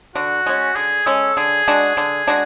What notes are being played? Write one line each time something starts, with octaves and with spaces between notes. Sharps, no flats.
D3 F#4
G#3 C#4
D3 G#4
G#3 C#4 A4
D3 G#4
G#3 D4 F#4
D3
G#3 D4 F#4